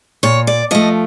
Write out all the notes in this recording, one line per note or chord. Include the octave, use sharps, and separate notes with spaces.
A#2 C#5
D5
F3 A3 D#5